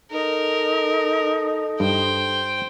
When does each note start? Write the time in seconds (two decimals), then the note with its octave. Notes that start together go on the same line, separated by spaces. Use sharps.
0.11 D#4 A4 A#4
1.80 G2 C5 G5